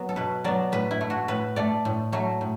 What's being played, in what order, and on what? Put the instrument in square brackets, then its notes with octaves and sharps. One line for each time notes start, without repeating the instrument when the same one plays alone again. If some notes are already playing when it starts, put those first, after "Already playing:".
Already playing: [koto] F#3 B3
A4
B2 B4
F#3 B3 D5
A2 B4
E4
A3
F#4
A2 B4
A3 D5
A2
F#3 A3
A2